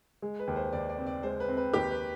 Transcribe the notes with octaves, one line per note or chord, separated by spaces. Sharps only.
G#3
B4
D#2
C5
D#2 D5
D5
C4
D5
G#3 C5
B4
C4
B4
D#2 G4
B4